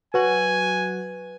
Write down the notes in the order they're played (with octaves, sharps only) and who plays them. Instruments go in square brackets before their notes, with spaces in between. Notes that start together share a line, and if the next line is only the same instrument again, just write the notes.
[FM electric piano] F#3 F#4 F#6 [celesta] B4 [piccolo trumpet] G#5